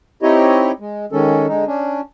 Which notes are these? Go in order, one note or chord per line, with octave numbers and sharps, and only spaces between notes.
C4 D#4 E4 G4 C#5 D#5
G#3
D#3 G#3 C#4 A4
D3 G#3 D#4
C#4 D4